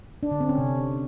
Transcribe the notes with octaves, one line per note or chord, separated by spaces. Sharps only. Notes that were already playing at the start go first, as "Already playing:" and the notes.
D4
D3
C4
C#4
C3